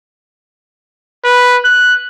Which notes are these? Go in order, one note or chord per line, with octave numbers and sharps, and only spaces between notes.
B4
F#6